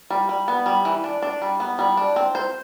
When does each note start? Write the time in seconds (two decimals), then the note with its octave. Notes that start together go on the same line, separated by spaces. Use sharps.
0.10 G3
0.29 G3
0.48 B3
0.66 G3
0.85 E3
1.04 D4
1.22 D4
1.42 G3
1.60 B3
1.79 G3
1.97 D4
2.16 C4
2.35 C5